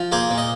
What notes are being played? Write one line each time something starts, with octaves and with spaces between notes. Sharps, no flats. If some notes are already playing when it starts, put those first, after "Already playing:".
Already playing: F3
A#3 G#4 C5
A#2
D#5